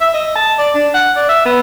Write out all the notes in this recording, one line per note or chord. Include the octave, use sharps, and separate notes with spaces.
E5
D#5
A5
D5
D4
F#5
D5
E5
B3